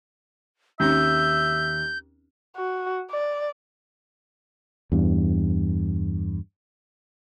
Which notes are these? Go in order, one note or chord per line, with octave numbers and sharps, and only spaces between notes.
D#2 C4 C#4 D#4 E5 G6
F#4
D5
E2 G2